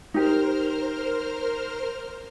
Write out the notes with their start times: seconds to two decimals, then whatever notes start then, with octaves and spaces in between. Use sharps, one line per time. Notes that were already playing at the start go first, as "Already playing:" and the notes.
0.14 D#4 G4 A#4 C5 F6